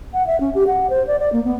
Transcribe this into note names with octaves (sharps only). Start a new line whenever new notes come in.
F#5
E5
C#4
G4
F#5
C5
D5
D5
A#3
B3